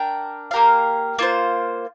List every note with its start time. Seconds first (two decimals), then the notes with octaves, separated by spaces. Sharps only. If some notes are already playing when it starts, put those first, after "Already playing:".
Already playing: D4 A#4 G5
0.51 A#3 G4 A#4 F5
1.19 A#3 F4 C5